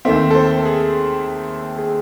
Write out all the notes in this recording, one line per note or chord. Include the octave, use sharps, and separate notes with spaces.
D#2 D#3 A3 C4 E5
A4
C5
G#4
G#4